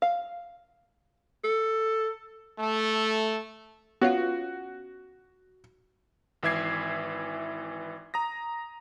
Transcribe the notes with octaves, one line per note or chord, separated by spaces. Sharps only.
F5
A4
A3
B3 C#4 F4 F#4
G#1 E3 E5 D6 G#6 C7
A#5 D#6 A#6